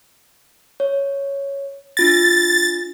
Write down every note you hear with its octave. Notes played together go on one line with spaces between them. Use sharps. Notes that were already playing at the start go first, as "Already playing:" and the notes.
C#5
D4 F4 A6 A#6